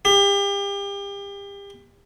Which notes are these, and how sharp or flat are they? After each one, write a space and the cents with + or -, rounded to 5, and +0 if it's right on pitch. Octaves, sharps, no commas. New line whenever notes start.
G4 +35